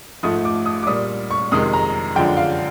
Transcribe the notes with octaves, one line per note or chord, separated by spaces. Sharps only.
G#2 F3 A3 D#6
D6
D#6
D6
A#2 G3 D#6
C#6
F2 C3 D#3 G#3 D#6
A#5
F#2 D3 F3 G#3 G5
F5